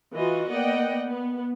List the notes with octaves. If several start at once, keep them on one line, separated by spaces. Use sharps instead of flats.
E3 F4 F#4 D#5
A#3 B3 D5 D#5 F#5 G5
B3